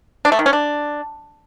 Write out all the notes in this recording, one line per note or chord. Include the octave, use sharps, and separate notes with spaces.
D4
A3
D#3
C#4
D4